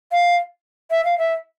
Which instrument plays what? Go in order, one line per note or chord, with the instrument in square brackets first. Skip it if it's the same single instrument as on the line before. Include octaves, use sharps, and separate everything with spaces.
[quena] F5
E5
F5
E5